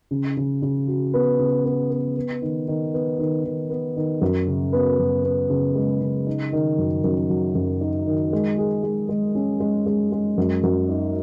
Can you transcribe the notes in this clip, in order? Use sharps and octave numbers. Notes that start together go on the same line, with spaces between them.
C#3
C#3
C#3
F#4
B3
C#3
B3
B3
B3
D#3
D#3
B3
D#3
D#3
B3
D#3
F#2
C#3
B3
F#2
B3
C#3
G#3
C#3
D#4
D#3
F#2
F#2
F#3
F#2
D#4
D#3
G#3
G#4
G#3
G#3
C#4
G#3
G#3
G#3
F#2
F#2
D#4